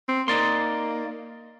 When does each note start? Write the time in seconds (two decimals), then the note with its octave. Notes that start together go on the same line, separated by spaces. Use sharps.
0.08 C4
0.28 A#3 D#4 D5 C6